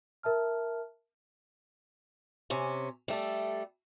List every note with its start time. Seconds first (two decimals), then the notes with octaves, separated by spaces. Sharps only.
0.23 A#4 E5 A5 F6
2.50 C3 C#4
3.08 G3 A3 A4